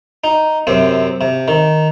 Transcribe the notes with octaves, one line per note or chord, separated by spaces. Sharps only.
D#4
F#2 C3 C4
C3
D#3